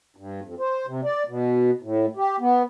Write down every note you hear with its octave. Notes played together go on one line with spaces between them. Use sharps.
G2
F2
C5
C3
D5
B2
A2
G4
B3